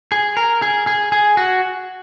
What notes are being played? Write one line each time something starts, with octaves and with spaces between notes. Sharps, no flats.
G#4
A#4
G#4
G#4
G#4
F#4